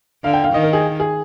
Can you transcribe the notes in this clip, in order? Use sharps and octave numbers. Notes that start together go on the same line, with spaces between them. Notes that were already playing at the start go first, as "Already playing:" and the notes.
D3 F5
G5
F5
D#3 D#5
A#4
G#4
G#4